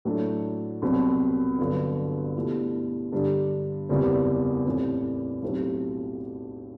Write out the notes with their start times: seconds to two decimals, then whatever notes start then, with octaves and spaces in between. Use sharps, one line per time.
0.05 A2 F#3 A3 D4
0.82 C2 B2 F#3 C4
1.58 G1 G2 F#3 B3
2.36 B2 A3 E4 G4
3.12 G2 D3 G3 D4 A4
3.89 F#1 E2 B2 G3 C4
4.66 A1 A2 G3 C4
5.42 B1 A2 F#3 C4 G4